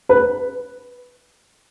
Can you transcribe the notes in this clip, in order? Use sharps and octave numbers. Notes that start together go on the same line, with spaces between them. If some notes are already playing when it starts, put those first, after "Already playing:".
B4